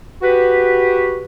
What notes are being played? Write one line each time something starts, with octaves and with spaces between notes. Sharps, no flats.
F#4 G4 B4